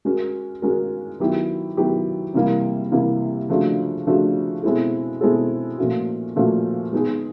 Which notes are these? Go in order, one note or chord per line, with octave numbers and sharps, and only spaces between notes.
G#3 C#4 F#4 A#4
G#3 C#4 F#4 A#4
D#3 F#3 B3 E4 G4
D#3 F#3 B3 E4 G4
C3 E3 G3 A#3
C3 E3 G3 A#3
C#3 F3 A3 D4 F#4
C#3 F3 A3 D4 F#4
B2 G#3 C4 E4 A4
B2 G#3 C4 E4 A4
A#2 F3 A3 C#4 F#4
A#2 F3 A3 C#4 F#4
G#3 B3 D#4 G#4